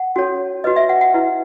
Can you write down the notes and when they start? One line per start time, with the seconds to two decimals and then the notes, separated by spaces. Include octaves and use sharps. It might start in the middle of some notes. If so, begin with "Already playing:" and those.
Already playing: F#5
0.16 C#4 F#4 A4 C#5
0.64 F#4 B4 D#5
0.76 E5
0.89 F#5
1.01 F#5
1.14 E4 B4